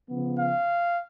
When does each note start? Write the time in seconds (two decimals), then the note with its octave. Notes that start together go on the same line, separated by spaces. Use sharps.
0.10 C#3 F3 B3
0.40 F5